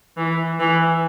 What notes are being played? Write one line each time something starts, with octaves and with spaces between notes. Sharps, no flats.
E3
E3